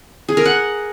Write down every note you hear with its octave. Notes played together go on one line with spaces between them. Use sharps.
G#4
A#4
F#5